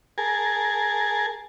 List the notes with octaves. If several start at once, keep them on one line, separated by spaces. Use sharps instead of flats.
G#4 A#4 G#5 A5